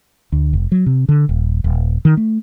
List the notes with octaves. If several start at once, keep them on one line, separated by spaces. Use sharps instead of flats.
D2
F1
F#3
C3
D3
D#1
D#1
D#3
A3